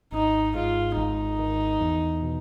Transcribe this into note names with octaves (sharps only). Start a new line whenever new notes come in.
G#1 D#4
G#2 F4
G#1 D#4
D#3
E2
B2